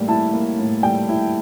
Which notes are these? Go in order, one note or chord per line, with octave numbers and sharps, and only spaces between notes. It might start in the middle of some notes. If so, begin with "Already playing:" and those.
Already playing: A2 G3 A#3
E4 A5
A#3
A2
G3 G5
E4